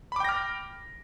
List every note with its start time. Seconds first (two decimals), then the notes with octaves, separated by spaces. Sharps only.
0.12 B5
0.16 D6
0.20 G5
0.25 A#6
0.29 F6